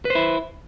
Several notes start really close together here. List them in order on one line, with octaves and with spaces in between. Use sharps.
B4 C5 E4